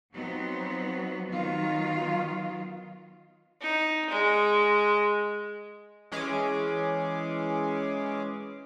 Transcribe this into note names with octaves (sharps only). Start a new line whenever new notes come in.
F3 F#3 B3 C4 D#4
D#3 F#3 B3 F4
D#4
G#3
E3 G#3 C#4 G#4 D6